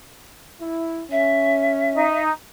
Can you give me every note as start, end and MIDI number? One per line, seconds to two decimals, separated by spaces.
0.61 1.03 64
1.11 2.06 61
1.11 2.19 76
1.93 2.31 63